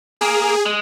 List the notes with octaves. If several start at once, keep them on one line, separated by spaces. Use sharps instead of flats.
A#3 G#4
G#3